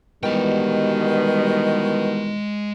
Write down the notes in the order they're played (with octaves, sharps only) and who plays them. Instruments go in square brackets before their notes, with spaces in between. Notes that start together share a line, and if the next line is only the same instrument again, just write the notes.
[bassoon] B2 [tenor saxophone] D#3 [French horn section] E3 G3 B3 [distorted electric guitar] G#3 G5